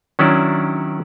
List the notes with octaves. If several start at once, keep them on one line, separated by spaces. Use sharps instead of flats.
D#3 F#3 C#4 D4 E4 D5